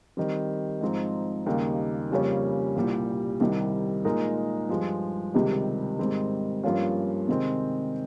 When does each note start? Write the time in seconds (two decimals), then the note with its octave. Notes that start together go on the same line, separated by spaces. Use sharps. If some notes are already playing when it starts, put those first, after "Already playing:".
0.17 D#3 G3 C4
0.81 G#2 F3 C4 D#4
1.46 D#2 C#3 G3 A#3 D#4
2.11 F2 C#3 G3 A#3 C#4
2.76 C2 A#2 G3
3.40 C2 C3 D#3 G3
4.05 A#2 G#3 D#4 A#4
4.69 G2 F3 G#3
5.34 C#2 C3 D#3 G3
5.99 G#2 D#3 G3 C4
6.63 G2 F3 A#3 C#4 F4
7.28 C3 D#3 G#3 C4